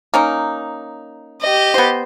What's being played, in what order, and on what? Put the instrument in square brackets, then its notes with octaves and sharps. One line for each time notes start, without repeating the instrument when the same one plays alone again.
[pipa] A#3 C#4 D#4
[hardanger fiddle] G4 D#5
[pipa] B3 C5